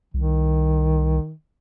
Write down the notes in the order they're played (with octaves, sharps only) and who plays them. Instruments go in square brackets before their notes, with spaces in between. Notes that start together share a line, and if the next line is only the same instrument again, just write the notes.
[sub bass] C2 [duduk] D#3